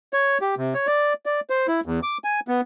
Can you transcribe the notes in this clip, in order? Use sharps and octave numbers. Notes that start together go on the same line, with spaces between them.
C#5
G4
C3
C#5
D5
D5
C5
E4
E2
D6
G#5
B3